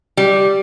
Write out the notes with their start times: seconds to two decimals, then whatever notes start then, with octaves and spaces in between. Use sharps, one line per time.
0.17 G3